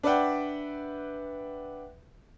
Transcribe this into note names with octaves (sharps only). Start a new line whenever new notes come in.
D4 B4 D5 E5 F#5 G5